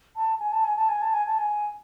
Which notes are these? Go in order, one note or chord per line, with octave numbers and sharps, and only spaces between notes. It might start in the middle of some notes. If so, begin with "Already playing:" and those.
A5
G#5
A5
G#5
A5
G#5
A5
G#5
A5
G#5